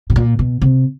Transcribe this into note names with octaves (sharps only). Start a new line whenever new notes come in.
B2
A#2
B2
C3